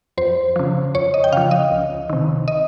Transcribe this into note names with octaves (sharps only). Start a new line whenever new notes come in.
F2 C5
C#3 F3
F2 C#5
D#5
G5
C#3 F3 F5
D#5
C#2
C3 D#3
D#5